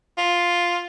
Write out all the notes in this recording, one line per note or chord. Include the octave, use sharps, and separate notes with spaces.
F4